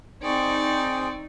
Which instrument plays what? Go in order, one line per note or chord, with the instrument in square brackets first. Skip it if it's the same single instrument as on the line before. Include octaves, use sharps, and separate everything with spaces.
[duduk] C4 [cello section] D#4 [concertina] G#4 C5 G5 [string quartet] D5 C#6